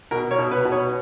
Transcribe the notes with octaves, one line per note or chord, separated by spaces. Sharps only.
B2 A#4
C#5
B2
B4
B2
C#5